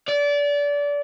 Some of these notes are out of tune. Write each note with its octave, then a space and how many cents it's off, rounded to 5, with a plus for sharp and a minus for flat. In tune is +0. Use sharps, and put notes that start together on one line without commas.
D5 -25